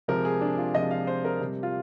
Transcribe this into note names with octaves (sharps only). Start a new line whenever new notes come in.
C3 F3 G#3 A#4
G#4
D4
F4
C3 F3 G#3 D#5
F5
C5
A#4
C3 G3
F4